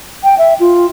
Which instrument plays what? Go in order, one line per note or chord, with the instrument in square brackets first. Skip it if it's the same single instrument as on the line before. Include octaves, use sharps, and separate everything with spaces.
[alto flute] G5
E5
F4